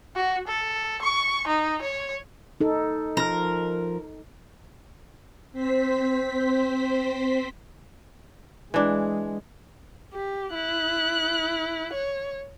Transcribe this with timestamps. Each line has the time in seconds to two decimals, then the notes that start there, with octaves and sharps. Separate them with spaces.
0.16 F#4
0.47 A4
1.02 C#6
1.47 D#4
1.82 C#5
2.61 D#4 A4
3.17 F3 A#4 F6
5.52 C4 C5 B6
8.74 E3 G#3 D4
10.13 G4
10.55 E4 F#6
11.93 C#5